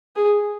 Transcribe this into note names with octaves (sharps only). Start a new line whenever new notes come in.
G#4